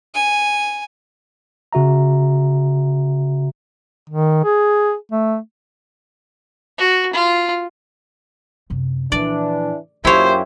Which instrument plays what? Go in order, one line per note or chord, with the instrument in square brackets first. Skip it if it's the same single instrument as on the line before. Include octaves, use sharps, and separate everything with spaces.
[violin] G#5
[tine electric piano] C#3 F#4 E5 A#5
[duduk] D#3
G#4
A3
[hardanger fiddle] F#4
F4
[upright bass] F#2 C3
[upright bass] A#2 F3 [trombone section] E3 D4 [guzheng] D5
[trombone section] F#2 F4 G4 [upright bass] A#3 [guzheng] E4 C#5 [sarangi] C5